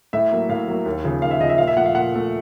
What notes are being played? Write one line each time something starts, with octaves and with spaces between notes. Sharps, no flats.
A2 E5
F#3 A#3
A2 F5
F#3 A#3
D#2
C#3 F3
D#2 F5
E5
C#3 F3 D#5 E5
A#2 F5
E5
F3 A3 F#5
F5
A#2 F#5
F3 A3